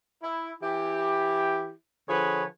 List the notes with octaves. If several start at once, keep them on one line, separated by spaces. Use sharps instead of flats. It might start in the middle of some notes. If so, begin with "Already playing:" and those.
E4
E3 E4 G4
D3 F3 G#4 B4 C#5